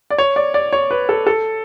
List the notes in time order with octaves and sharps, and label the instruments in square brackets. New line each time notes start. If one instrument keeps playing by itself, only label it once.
[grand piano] D5
C#5
D5
D5
C#5
B4
A4
A4